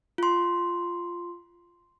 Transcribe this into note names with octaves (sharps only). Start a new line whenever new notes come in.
F4 C6